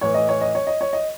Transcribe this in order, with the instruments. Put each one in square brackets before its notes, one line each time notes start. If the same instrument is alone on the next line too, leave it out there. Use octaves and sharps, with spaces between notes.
[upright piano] A2 E3 C#5
D#5
C#5
D#5
C#5
D#5
C#5
D#5